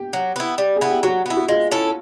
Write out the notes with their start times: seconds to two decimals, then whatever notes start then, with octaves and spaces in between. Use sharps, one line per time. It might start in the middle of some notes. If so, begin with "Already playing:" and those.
Already playing: G4
0.13 F#3
0.36 B3 E4
0.58 G3
0.76 G#4
0.81 B3 E4
0.90 G4
1.03 F#3 F#4
1.26 B3 E4
1.37 F#4
1.49 G#3 F4
1.72 C#4 E4 A4